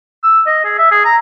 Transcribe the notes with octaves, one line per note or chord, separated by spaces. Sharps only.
E6
D#5
G#4
E5
G#4
A#5